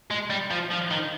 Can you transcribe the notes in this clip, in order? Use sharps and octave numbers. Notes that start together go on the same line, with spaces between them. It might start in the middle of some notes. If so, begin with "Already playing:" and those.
G#3
G3
F3
F3
D#3